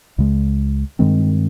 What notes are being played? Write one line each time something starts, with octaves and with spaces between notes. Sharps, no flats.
C#2 C#3 G#3
G2 D#3 G#3 C4